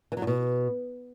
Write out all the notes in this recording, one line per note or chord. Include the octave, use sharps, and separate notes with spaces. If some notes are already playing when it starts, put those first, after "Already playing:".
E3
F#3
A2
B2